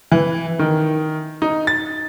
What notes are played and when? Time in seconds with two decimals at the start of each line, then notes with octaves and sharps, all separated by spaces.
0.12 E3
0.59 D#3
1.42 D#4
1.67 A6